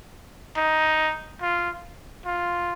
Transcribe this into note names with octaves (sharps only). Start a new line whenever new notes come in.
D#4
F4
F4